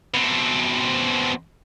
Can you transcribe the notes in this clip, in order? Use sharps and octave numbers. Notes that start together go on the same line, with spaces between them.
B2 C4